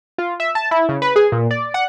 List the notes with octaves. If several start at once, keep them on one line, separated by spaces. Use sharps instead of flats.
F4
E5
A5
E4
C#3
B4
G#4
A#2
D5
F#5